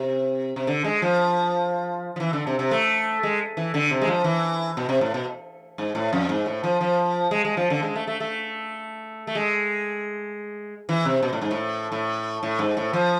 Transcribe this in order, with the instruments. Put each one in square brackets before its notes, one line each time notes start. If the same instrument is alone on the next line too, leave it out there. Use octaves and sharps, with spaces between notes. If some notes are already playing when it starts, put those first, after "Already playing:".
Already playing: [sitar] C3
C3
D3
G#3
F3
F3
E3
D3
C3
C3
A3
G#3
E3
D3
C3
G#3
F3
E3
B2
C3
A2
B2
G#2
A2
F2
G#2
A2
F3
F3
G#3
G#3
F3
D3
G#3
A3
A3
A3
A3
G#3
E3
C3
B2
A2
G#2
A2
A2
A2
G#2
A2
F3